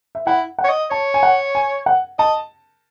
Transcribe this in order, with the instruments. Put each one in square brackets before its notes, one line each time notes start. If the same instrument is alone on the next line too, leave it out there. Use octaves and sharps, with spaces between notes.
[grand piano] E5
[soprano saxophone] E4 [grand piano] F#5
[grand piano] F#5
[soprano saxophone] C#5
D#5
[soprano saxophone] C#5 [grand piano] A5
[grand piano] G#5
F#5
G#5
F#5
[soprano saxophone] D#5 [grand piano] A5